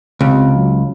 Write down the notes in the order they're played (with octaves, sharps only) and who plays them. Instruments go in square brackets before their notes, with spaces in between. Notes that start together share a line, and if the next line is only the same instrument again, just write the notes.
[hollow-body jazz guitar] C#2 [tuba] C3
[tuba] F#3